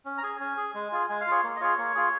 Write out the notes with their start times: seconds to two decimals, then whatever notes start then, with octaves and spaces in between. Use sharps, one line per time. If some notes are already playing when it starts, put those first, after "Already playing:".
0.05 C#4
0.18 A#5
0.23 G#4 G#5
0.40 C#4 G#5
0.57 G#4
0.74 G#3
0.92 F4 G#4
1.09 G#3 G#5
1.21 F5
1.27 F4 G#4 C#5
1.43 A#3
1.56 D#5
1.61 F4 G#4 C#5
1.78 A#3 C#5
1.95 F4 G#4